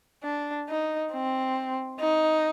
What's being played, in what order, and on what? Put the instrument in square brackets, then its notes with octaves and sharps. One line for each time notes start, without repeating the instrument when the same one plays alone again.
[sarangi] D4
D#4
C4
D#4